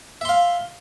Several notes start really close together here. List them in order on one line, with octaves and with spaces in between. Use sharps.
E5 C6 F5